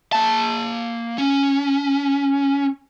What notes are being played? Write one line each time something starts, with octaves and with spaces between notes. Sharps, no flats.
A#3 A5
C#4